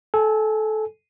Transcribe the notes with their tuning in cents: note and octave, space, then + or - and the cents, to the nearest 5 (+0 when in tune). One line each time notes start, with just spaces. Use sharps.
A4 -20 G#5 +0